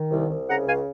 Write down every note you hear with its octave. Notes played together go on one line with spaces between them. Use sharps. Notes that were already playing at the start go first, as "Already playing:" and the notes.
Already playing: D#3
C2
C2
C#3 F#5 A#5
C#2 F5 G#5